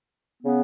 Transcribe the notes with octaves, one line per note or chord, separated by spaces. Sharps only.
C#3 B3